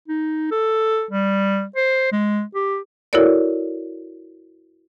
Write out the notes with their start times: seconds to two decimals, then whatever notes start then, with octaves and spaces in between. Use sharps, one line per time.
0.08 D#4
0.51 A4
1.11 G3
1.76 C5
2.12 G#3
2.55 G4
3.13 E4 F#4 A4 A#4 C#5 D5